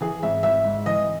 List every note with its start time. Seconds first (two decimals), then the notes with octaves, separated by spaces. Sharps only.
0.01 E3 G#4
0.23 G#1 E5
0.43 G#1 E5
0.65 G#2
0.86 E3 D#5